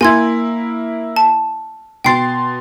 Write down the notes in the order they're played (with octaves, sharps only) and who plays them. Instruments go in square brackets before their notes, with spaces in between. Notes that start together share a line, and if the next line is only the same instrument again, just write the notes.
[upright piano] A#3 E4 [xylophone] G#5 C6 G#6
[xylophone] A5
[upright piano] B2 C6 A6 [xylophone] G5 C7